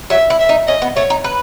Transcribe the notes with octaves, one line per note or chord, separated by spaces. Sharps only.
F#3 E5
E4
E5
D#4
C#4 D#5
B3
A3 C#5
D#4
B4